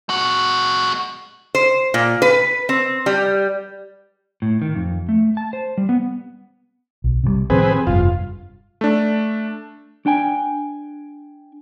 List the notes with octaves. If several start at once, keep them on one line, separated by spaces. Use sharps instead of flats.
G#3 F#4
C5
A#2
B4
C4
G3
A2
D#3
F2
A3
A5
C5
G3
B3
B1
C3 D#3 G3
A2 D#3 F3 C4 G#4 B4
F1 G2 F4
A3 D4
D4 G5 G#5